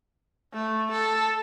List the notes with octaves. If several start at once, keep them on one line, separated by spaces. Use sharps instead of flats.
A3
A4